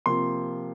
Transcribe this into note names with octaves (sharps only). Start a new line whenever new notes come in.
C3 F3 A#3 C6